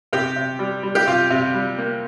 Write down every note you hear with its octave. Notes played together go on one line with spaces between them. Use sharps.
C3 G4
C3
G3
G3
G4
C3 F4
C3
G3
A#3